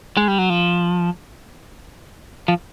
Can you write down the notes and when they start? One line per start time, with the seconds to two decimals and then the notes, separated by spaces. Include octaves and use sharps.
0.17 G#3
0.28 G3
0.38 F#3
0.50 F3
2.48 F3